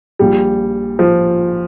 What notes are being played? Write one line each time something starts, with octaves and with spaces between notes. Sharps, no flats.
A#1 A#2 G3
F3